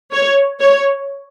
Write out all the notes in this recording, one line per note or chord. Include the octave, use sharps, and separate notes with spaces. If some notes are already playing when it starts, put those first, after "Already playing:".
C#5
C#5